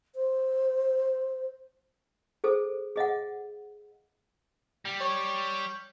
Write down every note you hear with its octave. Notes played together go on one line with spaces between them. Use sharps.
C5
G#4 A4 C5
G#4 D#5 F5 F#5
G3
C#5